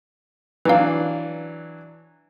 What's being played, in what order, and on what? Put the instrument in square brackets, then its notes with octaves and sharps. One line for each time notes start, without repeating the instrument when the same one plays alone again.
[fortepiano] E3 F#3 D4 [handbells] B4 F5